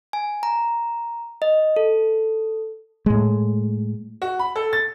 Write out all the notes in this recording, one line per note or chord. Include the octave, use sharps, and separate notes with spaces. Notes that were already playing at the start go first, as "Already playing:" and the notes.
G#5
A#5
D#5
A4
A2 G#3
F#4
B5
A4
A6